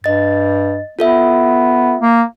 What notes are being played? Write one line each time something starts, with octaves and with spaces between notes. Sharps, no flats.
G2 D#5 A6
B3 F4 A4 E5
A#3